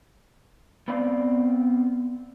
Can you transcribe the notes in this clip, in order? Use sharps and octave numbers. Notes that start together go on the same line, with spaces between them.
B3 C4 D5 F5